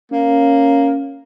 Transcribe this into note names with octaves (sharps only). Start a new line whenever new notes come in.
A#3 C#4